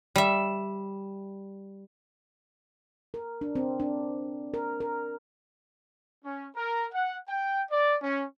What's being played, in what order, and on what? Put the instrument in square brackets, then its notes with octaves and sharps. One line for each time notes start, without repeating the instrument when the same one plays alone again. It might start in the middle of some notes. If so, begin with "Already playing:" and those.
[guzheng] G3 E5
[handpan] A#4
D4
C4
D4
A#4
A#4
[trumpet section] C#4
A#4
F#5
G5
D5
C#4